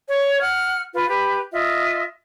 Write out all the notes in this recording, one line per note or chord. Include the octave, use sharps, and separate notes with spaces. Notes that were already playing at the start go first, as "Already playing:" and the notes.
C#5
F#5 F6
F4 B4
G4 B4
F4 D#5 E5